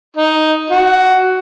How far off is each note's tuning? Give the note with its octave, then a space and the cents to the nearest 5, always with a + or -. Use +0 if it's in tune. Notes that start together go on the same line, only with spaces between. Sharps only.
D#4 +5
F#4 +10